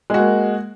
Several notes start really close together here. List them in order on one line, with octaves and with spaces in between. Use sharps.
G#3 F#4 A#3